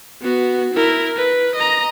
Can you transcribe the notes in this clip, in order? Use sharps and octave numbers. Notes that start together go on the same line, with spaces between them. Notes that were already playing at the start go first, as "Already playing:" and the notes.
B3 F#4
E4 A#4
B4
D#5 A#5